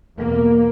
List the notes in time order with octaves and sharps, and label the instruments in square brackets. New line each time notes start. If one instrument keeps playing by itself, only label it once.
[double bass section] E2 B2 A#3